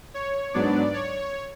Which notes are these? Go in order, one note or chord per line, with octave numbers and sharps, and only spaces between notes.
C#5
G#2 F#3 B3 D4 D5
C#5